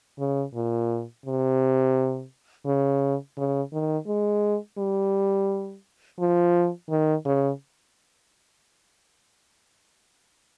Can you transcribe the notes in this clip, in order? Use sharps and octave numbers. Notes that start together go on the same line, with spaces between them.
C#3
A#2
C3
C#3
C#3
D#3
G#3
G3
F3
D#3
C#3